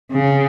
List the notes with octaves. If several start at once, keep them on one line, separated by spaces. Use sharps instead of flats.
C#3